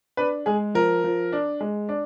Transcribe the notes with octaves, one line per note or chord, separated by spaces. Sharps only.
D4 B4
G#3 G#4
F3 A#4
F3
D4
G#3
D4